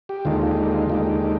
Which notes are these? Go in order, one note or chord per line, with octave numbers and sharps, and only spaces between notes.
G4
D#2 D3 G#3 D#4 F4
G4
G4
F4
D#2 D3 G#3 D#4 G4